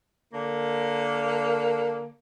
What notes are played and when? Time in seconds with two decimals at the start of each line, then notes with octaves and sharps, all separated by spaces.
0.34 D3 A#3